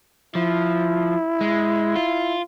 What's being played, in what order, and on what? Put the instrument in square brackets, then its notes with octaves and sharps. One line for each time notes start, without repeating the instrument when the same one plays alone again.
[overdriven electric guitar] F3 [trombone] E4
[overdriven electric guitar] G#3
F4